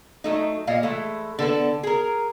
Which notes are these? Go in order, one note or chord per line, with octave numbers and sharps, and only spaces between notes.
F#3 A3 D#4
A#2 D#5 F5
E3 G#3 A3
D3 B3 A4
G#4 A#4